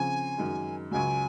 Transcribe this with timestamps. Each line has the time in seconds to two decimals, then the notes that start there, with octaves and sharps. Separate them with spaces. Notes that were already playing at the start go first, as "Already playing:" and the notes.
Already playing: C#3 F3 C4 G#5
0.37 F#2 D#3 G#3
0.91 C#2 C#3 F#3 G#5